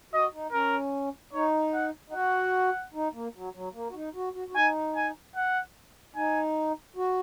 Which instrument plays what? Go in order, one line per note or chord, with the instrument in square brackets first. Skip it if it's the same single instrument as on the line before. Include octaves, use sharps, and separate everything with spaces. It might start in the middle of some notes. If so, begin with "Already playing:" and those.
[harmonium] F#4 [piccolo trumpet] D#5
[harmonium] D#4
[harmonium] C#4 [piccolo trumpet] A#4
[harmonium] D#4 [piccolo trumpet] C#5
[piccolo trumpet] F#5
[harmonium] D#4
[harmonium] F#4 [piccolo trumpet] F#5
[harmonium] D#4
A#3
F#3
F#3
A#3
F#4
D#4
F#4
F#4
F#4
[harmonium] D#4 [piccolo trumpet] G#5
[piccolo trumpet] G#5
F#5
[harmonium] D#4 [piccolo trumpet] G#5
[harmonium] F#4